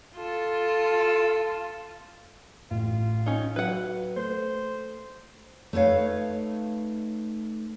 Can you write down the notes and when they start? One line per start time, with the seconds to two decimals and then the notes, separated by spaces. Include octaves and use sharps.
0.16 F4 A4
2.71 A1 F4
3.26 C#4 D#4
3.56 F#3 B4 F#5
4.16 A3 C5
5.73 A3 D#4 B4 C#5 F5